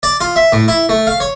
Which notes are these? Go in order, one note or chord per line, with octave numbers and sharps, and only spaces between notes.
D5
F4
E5
A2
E4
A3
F5
C#5